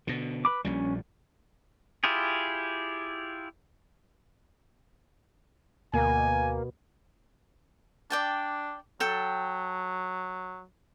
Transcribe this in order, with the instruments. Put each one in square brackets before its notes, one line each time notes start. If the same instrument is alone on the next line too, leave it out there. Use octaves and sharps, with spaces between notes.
[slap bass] B2 D3
[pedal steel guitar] B4 B5 D6
[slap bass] A#1 A#2 G3 [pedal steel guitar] C#4
[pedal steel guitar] E4 F4 G4 G#4
[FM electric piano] D2 [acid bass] B2 [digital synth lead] A#3 [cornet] G#5
[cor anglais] D4 [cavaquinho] D5 G5 A5
[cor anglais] F#3 [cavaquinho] A4 G5